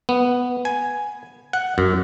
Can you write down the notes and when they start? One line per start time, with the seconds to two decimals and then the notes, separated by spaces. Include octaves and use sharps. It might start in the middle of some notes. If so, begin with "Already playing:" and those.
0.09 B3
0.65 G#5
1.53 F#5
1.78 F#2